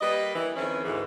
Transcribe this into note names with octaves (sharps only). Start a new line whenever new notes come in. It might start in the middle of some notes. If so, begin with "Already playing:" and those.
G3 A#3 B4 D#5
E3
F2 D#3 C4 C#4 E4 B4
D2 G#2 E3